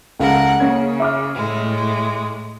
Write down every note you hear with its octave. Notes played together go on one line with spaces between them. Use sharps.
C#2 A4 A#4 F5 F#5
C#3 A#3 C#4 G#6
E5 D6 F6
A2 G#3